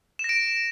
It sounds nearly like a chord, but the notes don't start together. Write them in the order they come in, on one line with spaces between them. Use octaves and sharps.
E7 A#6 D7